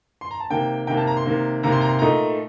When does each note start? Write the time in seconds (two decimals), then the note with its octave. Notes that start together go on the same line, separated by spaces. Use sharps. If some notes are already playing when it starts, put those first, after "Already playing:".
0.21 C6
0.31 A#5
0.40 A5
0.50 C3 D#3 A#3 G5
0.87 C3 D#3 A#3 G5
0.97 A5
1.07 A#5
1.17 C6
1.26 C3 D#3 A#3
1.63 C3 D#3 A#3 A#5
1.72 C6
1.81 A#5
1.89 C6
1.99 A#2 A3 D#4 A#5